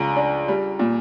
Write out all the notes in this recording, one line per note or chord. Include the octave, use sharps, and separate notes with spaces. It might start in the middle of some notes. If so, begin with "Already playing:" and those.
Already playing: C#2 A#5
D4
G3
A#2